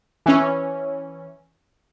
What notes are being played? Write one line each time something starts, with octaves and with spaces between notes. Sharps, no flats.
E3 C#4